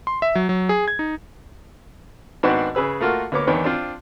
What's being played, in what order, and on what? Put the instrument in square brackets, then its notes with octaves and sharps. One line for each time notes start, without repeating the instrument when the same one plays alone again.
[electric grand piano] C6
E5
F#3
F#3
G#4
G#6
D#4
[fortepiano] G#2 D#3 B3 C4 D4 F#4
C#3 G#4 B4 E6
A3 A#3 F4 F#4 A#4
D2 A#3 B3 C#5 D6
E2 D#3 B3 D4 C#5
C4 D4 F4